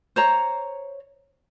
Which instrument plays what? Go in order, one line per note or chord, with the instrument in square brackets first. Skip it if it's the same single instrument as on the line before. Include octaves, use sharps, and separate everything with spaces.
[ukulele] C5 C#5 A#5